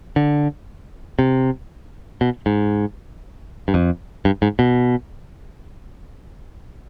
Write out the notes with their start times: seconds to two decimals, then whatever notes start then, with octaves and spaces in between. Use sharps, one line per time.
0.16 D3
1.19 C3
2.21 B2
2.46 G#2
3.68 G2
3.74 F2
4.25 G2
4.42 G#2
4.59 B2